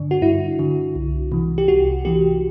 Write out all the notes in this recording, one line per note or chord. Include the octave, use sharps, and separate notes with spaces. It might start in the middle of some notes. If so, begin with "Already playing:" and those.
Already playing: G2 D3 D4
F#4
G2 E4
D3
C2
C3 E3
G4
C2 F#4
C3 E3 G4